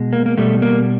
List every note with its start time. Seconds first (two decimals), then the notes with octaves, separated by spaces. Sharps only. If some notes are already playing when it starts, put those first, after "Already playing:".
Already playing: B2 G#3
0.13 A#3
0.26 A#3
0.38 B2 G3 A3
0.62 A#3